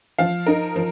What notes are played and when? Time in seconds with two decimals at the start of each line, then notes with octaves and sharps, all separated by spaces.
0.18 F3 F5
0.46 D#4 A#4
0.76 F3